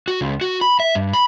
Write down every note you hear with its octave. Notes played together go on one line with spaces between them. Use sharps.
F#4
C#2
F#4
B5
E5
G2
B5